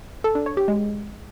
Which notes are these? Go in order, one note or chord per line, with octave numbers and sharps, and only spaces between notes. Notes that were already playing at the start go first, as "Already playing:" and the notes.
A4
D4
C#5
G4
G#3